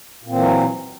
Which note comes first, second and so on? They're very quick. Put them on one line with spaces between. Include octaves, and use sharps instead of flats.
A#2 C4 E3 F#3